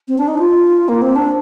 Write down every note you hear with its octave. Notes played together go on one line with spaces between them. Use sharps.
C4
D4
D#4
F4
A#3
C4
D4